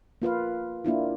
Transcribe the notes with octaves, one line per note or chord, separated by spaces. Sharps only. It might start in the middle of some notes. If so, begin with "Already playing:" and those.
A#3 F4 B4 F5
A#3 D4 E4 F4